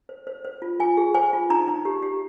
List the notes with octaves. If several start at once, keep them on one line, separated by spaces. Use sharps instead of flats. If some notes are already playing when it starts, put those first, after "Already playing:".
C5
C5
C5
F4
F4 G#5
G#4
C5 G#5
F4
D#4 A#5
D#4
G4
G4